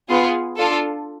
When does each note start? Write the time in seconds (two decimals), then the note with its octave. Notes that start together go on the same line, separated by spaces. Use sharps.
0.09 B3 F4 G#4
0.57 D4 F4 A4